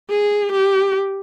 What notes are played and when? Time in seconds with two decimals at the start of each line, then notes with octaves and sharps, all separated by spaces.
0.10 G#4
0.52 G4